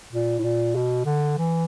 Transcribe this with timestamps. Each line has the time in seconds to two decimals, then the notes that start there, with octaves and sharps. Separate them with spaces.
0.12 A#2
0.39 A2
0.44 A#2
0.75 B2
1.05 D3
1.38 E3